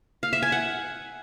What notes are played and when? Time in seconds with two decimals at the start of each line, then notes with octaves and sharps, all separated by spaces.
0.23 F5
0.33 E5
0.42 G#5
0.52 F#5